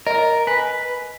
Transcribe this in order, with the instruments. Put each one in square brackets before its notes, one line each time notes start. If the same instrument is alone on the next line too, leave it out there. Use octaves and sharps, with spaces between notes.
[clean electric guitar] A#4 [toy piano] D#5
[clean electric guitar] B4 [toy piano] G#5